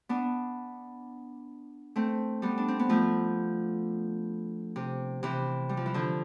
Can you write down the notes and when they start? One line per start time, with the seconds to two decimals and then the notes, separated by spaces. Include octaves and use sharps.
0.09 B3 D4
1.96 A3 C4
2.42 G3 B3
2.58 D4
2.68 C4
2.79 B3
2.89 F3 A3
4.76 C3
5.23 C3 E3
5.69 G3
5.77 F3
5.86 E3
5.94 D3 F3